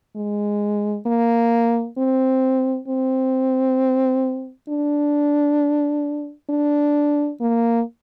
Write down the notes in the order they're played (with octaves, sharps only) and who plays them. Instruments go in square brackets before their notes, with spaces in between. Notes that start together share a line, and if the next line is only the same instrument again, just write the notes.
[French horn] G#3
A#3
C4
C4
D4
D4
A#3